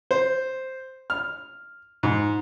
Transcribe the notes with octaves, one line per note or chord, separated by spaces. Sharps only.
C5
F6
G#2